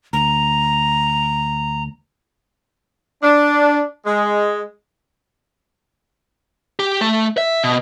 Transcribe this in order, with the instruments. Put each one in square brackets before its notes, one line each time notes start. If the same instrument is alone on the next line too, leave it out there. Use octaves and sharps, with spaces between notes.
[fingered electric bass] D2 [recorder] A#5
[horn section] D4
G#3
[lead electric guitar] G4
A3
E5
B2